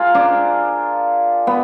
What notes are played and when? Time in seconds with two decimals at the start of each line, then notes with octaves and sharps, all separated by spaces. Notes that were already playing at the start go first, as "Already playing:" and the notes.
Already playing: F4 G#4 A#4
0.15 D4
1.47 B3